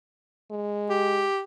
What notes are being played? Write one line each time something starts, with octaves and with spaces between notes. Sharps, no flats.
G#3
G4